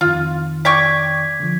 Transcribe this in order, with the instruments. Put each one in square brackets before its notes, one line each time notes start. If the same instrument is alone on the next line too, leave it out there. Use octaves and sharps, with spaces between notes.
[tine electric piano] F2 D#3 [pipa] F4
[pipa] D5 G5 C#6 [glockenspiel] G#6 B6
[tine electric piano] D3 F3